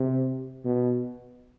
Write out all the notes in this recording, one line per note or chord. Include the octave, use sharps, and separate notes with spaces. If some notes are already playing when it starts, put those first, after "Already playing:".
Already playing: C3
B2